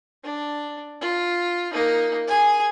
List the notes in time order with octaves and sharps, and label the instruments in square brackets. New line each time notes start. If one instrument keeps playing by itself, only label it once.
[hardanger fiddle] D4
F4
A#3 D#4
G#4 G#5